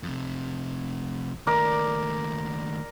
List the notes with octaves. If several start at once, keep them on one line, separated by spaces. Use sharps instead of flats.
F2 C3
D#2 A3 A#4 D5